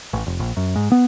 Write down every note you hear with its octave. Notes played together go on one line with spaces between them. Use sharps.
A1
F1
A#1
F#2
G#2
B3